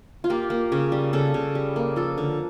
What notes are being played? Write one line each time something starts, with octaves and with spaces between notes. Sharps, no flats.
F4
A#3 G4
A#3
C#3
G3
C#3 A4
C#3
G3
A#3
F3 A4
D3